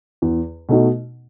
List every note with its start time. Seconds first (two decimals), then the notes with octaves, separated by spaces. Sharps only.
0.22 E2
0.69 B2 A3 D#4 F#4